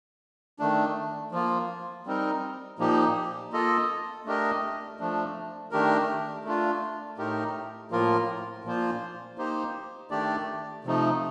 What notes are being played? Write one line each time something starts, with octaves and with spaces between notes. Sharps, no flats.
D#3 A3 D4
F3 A#3 F4
G3 C4 D#4 A#4
A#2 F3 A#3 D#4 G4
A#3 F4 A4 D#5
A3 D4 G4 A#4 D#5
F3 A3 D4
D#3 A3 D4 G4 A#4
A3 D4 F4
A2 A3 D#4 G4 A#4
A2 F3 A#3 F4 A#4
A#2 F3 A#3 F4 C5
A#3 D#4 G4 C5
D#3 A3 D4 G4 D5
C3 F3 A3 D#4